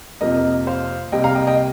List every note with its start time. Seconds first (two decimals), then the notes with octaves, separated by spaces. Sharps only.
0.21 F2 C3 F3 A#3 A#4 D#5
0.67 C5 F5
1.12 C2 C3 G3 A#3 D#5 G5
1.24 F5 A#5
1.35 D#5 G5
1.47 D#5 G5